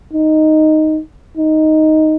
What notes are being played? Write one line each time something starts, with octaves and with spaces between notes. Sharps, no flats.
D#4
D#4